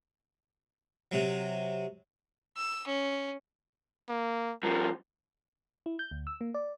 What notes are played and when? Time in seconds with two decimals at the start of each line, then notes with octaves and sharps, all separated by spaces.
1.12 C3 F#3
2.57 E6
2.87 C#4
4.09 A#3
4.63 G2 F3 A#4
5.86 E4
5.99 G6
6.11 D2
6.27 E6
6.41 A#3
6.54 D5